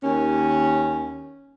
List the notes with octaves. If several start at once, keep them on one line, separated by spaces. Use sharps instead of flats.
D#2 C#4